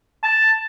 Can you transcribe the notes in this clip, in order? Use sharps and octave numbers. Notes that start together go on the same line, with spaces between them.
A5